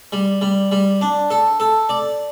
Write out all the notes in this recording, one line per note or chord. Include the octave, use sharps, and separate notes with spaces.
G3
G3
G3
D4
A4
A4
D5